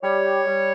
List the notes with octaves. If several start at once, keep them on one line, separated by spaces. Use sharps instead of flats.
G3 C#5
G3